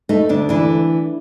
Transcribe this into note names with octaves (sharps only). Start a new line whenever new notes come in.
A3 D#4
D2 D4
E3 D4